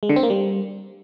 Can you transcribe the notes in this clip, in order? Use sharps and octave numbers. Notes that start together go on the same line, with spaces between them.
G#3
D3
C4
A#3
G3